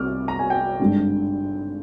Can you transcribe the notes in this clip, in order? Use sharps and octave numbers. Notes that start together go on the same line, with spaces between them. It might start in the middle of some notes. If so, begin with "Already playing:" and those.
Already playing: C2 C3 G3 A#3 D6 F6
A#5
G#5
G5
G#1 G2 D3